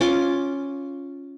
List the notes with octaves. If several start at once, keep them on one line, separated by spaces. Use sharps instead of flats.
C#4 F4 C6 D6